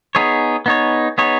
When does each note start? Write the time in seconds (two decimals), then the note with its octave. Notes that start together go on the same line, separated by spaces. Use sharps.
0.15 B3 D#4 G#4 C#5
0.66 B3 D#4 G#4 C#5
1.18 B3 D#4 G#4 C#5